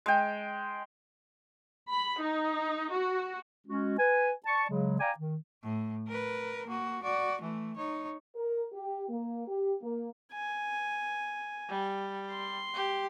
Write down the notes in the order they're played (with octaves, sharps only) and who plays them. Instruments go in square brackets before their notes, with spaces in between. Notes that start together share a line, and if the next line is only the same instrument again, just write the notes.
[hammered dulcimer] G#3 G5
[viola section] B5
D#4
F#4
[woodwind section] G#3 C#4 F#4
B4 G#5
D5 A5 C#6
C#3 F#3 G#3
D5 F5 G5 G#5 A#5 D6
D#3
[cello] A2
A#4 B4
A#3 F#4
F#4 D5
E3 A3
D#4 C#5
[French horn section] A#4
G4
A#3
G4
A#3
[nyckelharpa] G#5
[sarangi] G3
[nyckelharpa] C6
[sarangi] G4